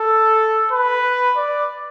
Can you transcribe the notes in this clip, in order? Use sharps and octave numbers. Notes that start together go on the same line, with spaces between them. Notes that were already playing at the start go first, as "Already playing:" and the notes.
Already playing: A4
B4
D5